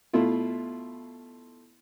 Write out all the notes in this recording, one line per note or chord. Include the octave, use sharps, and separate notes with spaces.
B2 A3 E4 F4